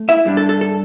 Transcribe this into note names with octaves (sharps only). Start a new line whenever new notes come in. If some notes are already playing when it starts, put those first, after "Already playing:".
Already playing: A3
E4 E5
G2 G3 D4
A4
A4
A4